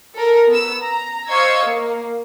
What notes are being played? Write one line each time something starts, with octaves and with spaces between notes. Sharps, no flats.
A4 A#4
B3 E6
A#5
C5 D#5 F5 C#6 E6 G#6
A#3